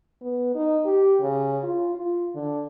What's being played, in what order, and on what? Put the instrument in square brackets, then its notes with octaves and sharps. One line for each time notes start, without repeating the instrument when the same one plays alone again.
[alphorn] B3
D#4
G4
C#3
F4
F4
D3